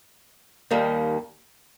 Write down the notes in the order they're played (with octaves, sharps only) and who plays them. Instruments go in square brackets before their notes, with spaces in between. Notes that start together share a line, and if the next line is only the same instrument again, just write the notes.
[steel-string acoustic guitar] D#2 D#3 G3 A#3